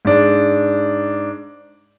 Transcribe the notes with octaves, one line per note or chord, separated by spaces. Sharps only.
G#2 D4